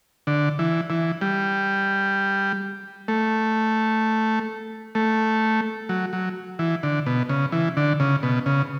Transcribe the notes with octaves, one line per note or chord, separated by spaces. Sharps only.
D3
E3
E3
G3
A3
A3
F#3
F#3
E3
D3
B2
C#3
E3
D3
C#3
B2
C#3